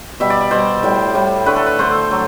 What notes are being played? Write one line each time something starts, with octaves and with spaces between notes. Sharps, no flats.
B2 G3 E5
D5
D5
B2 G3 C5
A2 G3
A2 G3
D3 A3 B4
A4
B4
D3 A3 C5
F#3 A3